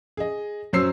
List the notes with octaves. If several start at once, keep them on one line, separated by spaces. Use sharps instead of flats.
G#4 D#5
F#2 F#3 C#4 C5 E6 C7